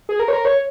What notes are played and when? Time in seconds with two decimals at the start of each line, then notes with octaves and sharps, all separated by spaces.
0.09 G#4
0.19 A#4
0.28 C#5
0.33 A#4
0.45 C#5